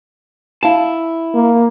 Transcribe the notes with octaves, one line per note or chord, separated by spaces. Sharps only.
E4 F5 A5
A#3